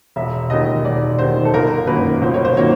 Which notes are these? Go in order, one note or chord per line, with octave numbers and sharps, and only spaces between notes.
E1 E5
D#2 D#3 D#5
E1 D5
D#2 D#3 C5
A4
G1 A#4
F#2 D#3 F#3 A#3 B4
G1 C5
C#5
C5
D#3 F#3 A#3 C#5